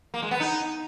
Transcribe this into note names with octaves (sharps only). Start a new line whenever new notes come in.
A#3
G#3
B3
D#4